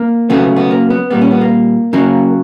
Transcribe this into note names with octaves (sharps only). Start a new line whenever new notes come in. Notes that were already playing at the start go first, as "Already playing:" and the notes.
Already playing: A#3
C#3 F#3 A3 B3
B3
A#3
B3
A#2 G3 A#3 B3
C#4
B3
A#3
C#3 F#3 A#3